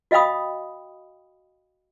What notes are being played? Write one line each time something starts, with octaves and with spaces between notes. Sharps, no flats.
F#4 D#5 F5 G5 B5 D#6